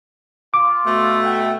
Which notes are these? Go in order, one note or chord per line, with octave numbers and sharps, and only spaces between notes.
F4 D6
B2 A3
E5 F#5 G5